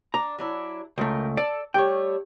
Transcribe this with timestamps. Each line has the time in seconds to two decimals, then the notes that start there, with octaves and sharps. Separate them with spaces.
0.14 D4 A#5
0.38 F#3 D4 E4
0.98 C#2 A3 A#4 G5
1.37 A4 D5
1.74 G3 A3 C#5 G5